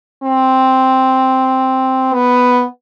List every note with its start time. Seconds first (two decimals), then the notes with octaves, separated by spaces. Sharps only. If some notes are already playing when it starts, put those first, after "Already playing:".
0.24 C4
2.15 B3